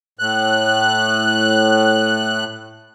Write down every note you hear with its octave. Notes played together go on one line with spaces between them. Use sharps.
A2 F#6